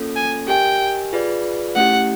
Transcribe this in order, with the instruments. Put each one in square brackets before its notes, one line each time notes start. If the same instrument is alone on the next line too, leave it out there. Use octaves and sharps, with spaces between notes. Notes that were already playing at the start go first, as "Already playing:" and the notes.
Already playing: [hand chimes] A#3 C#4 F4 A4
[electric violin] G#5
[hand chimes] G4 A#4 D#5 G#5 [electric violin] G5
[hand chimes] F4 G#4 B4 D5
[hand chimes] A3 C#4 E4 G4 [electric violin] F#5